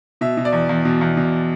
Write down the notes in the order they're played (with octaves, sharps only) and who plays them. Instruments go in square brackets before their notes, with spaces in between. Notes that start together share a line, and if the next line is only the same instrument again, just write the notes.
[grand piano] B2 E5
B2
D5
E2
E2
B2
E2
B2